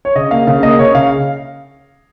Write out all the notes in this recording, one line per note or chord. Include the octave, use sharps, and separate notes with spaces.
C#5
C#3 D#5
A#3 F5
C#3 F5
A#3 D#5
C#3 C#5
C#3 F5